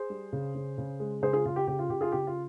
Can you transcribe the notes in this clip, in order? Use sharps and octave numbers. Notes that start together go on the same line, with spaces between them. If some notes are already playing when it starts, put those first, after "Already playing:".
Already playing: G#4 C5
G3
C#3
C#3
C#3
G#3
C#3 G#4 C5
F4 G#4
C#3 F4
G4
C#3 G4
F4
C#3 G4
F4 G#4
C#3 G4
F4